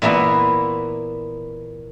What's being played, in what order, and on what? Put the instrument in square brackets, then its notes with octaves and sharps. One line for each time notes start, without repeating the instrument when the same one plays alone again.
[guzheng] A#2 E3 A#3 B3 E4